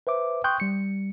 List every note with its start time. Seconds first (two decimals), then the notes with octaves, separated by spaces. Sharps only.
0.07 B4 C5 E5 D6
0.44 G5 C6 C#6 D#6 F#6 G6
0.60 G3 C#7